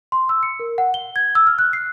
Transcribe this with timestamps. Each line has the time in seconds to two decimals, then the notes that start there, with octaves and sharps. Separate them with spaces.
0.12 C6
0.29 E6
0.43 C#7
0.60 A#4
0.78 F#5
0.94 G7
1.16 G#6
1.35 E6
1.47 F6
1.59 F#6
1.73 C7